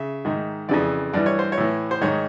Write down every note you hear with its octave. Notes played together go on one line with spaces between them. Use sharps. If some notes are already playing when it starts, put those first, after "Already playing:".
Already playing: C#3 E5
G#2 D#3
F2 C#3 E3 D5
G2 E3 D5
C#5
C5
C#5
A2 E3
C5
G#2 D#3 C#5